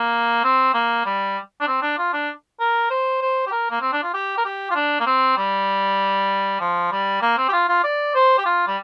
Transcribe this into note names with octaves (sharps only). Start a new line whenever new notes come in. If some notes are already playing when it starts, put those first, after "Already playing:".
Already playing: A#3
C4
A#3
G3
D4
C4
D4
F4
D4
A#4
C5
C5
G4
A#4
A#3
C4
D4
F4
G4
A#4
G4
F4
D4
A#3
C4
G3
F3
G3
A#3
C4
G4
F4
F4
D5
C5
G4
F4
G3